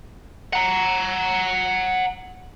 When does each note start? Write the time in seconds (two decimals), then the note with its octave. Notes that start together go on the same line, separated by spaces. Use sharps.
0.53 F#5 A#5